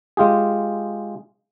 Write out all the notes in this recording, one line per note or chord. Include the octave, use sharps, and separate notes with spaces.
G#3 F4 G4 G#4